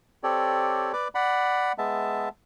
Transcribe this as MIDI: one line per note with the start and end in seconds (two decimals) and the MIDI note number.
0.23 0.92 60
0.23 0.92 67
0.23 0.92 69
0.23 0.92 73
0.23 0.92 74
0.93 1.08 71
0.93 1.08 74
0.93 1.08 86
1.15 1.72 74
1.15 1.72 78
1.15 1.72 83
1.78 2.29 56
1.78 2.29 59
1.78 2.29 76
1.78 2.29 81